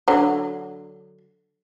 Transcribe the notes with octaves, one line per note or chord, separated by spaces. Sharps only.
D3 F#3